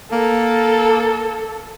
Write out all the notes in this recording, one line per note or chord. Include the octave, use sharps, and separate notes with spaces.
A#3 A4